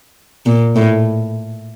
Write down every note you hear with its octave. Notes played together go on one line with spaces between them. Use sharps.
A#2
A2